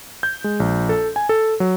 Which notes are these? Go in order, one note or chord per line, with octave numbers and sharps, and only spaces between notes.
G6
G#3
A#1
A4
G#5
A4
F#3